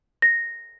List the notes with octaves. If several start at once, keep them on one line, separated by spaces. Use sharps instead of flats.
A#6